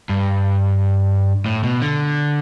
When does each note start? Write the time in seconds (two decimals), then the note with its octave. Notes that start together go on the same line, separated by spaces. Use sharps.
0.09 G2
1.46 A2
1.64 B2
1.82 D3